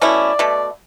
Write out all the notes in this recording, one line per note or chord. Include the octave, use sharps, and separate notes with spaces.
B2 A3 C#4 E4 D5
B2 A3